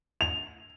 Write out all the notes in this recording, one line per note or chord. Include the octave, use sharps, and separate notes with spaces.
F7